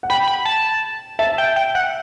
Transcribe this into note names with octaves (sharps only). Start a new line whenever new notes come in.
F#5
G5 B5
B5
A5
E5 A5
G5
G5
F#5